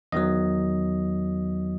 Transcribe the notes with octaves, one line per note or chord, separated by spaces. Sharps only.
E2 D#3 F#3 D#5